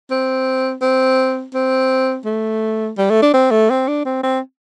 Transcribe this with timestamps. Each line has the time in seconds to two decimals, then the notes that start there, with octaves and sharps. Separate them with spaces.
0.10 C4
0.82 C4
1.54 C4
2.25 A3
2.98 G3
3.10 A3
3.22 D4
3.34 C4
3.51 A3
3.70 C4
3.88 D4
4.05 C4
4.23 C4